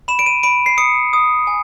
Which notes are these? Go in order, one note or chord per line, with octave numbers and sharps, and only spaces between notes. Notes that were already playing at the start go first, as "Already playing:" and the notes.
B5 E7
D7
D#7
B5 D7
C7
D#6 C#7
D#6
G#5